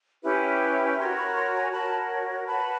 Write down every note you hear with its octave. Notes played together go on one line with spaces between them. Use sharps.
C#4 E4 G4 B4
F#4 A#4 C#5 A#5 C6
B5 C#6
A#5 C6
G#5 A#5
F#4 A#4 C#5 A5 B5
F#4 B4 A5 B5